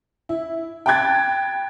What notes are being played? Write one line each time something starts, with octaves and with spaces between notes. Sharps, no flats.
E4
G5 A5 B5 F#6 G#6 A6